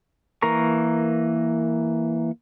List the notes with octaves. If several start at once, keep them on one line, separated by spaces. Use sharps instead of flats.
E3 A#3 A#4 A#5 C#6